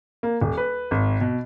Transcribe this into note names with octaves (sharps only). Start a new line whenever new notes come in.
A#3
D#1
B4
G#1
B2